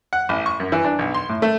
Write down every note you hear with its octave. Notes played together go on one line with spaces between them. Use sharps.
F#5
A1
C#6
F#2
E3
D4
B1
C6
A2
A3